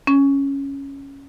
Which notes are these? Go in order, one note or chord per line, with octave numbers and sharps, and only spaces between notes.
C#4